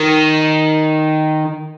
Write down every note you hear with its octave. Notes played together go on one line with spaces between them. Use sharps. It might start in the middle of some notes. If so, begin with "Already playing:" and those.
Already playing: D#3